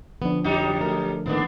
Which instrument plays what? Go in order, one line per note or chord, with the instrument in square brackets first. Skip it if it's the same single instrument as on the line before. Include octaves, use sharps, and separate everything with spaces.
[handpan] D3 F3 D4 [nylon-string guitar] B3
[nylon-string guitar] F2 G4 [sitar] F#3 G3 D#4
[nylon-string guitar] A3 A#4
[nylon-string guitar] A2 D#3 A#3 [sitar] B3 D4